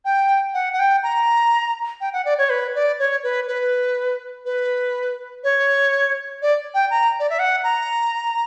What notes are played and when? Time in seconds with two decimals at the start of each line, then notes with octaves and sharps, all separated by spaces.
0.05 G5
0.54 F#5
0.73 F#5
0.79 G5
1.03 A#5
2.01 G5
2.13 F#5
2.25 D5
2.38 C#5
2.50 B4
2.75 D5
2.99 C#5
3.23 B4
3.47 B4
4.45 B4
5.44 C#5
6.42 D5
6.74 G5
6.90 A#5
7.20 D5
7.30 E5
7.39 F#5
7.64 A#5